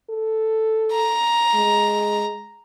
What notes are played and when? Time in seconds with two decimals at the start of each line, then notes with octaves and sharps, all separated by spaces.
0.10 A4
0.93 A#5
1.55 G#3